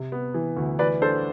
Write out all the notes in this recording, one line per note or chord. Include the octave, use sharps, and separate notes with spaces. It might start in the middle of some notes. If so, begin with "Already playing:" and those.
Already playing: C3
B3
E3
D2
E3 B4 D5
D4 A4 C5